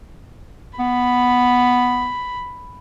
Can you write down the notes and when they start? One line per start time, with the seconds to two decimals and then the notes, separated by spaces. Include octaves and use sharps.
0.79 B3 B5